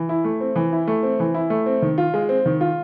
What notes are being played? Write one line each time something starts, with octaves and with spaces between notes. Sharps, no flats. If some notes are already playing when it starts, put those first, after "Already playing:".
Already playing: E3
E4
A3
C4
E3
E4
A3
C4
E3
E4
A3
C4
D#3
F4
G#3
C4
D#3
F4